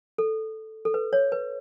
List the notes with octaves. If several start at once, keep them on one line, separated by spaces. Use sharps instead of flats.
A4
A4
B4
C#5
B4